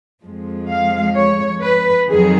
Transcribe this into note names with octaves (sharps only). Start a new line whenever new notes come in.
F2 F3 G#3
F5
C#5
B4
F2 D#3 F#3 G#4